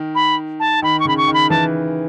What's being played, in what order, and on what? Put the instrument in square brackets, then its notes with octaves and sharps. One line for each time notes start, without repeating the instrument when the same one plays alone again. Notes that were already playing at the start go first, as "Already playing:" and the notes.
Already playing: [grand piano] D#3
[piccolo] B5
A5
[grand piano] D#3 [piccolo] B5
[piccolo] C#6
[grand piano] C#3 [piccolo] B5
[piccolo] C#6
[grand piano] D#3
[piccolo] B5
[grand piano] E3 [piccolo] A5